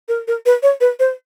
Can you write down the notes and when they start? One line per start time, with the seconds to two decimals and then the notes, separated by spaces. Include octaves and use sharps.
0.09 A#4
0.28 A#4
0.46 B4
0.63 C#5
0.81 B4
1.00 C5